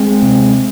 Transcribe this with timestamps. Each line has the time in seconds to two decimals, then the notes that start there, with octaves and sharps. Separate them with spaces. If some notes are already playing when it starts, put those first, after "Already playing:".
Already playing: G#3 C4
0.22 C3